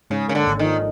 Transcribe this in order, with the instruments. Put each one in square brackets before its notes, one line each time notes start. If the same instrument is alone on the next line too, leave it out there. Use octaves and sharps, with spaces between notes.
[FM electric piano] G#2 [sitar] C#3
[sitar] C#3 [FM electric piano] A#3
[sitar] D3
[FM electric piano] G#1
[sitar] D#3
[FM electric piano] F3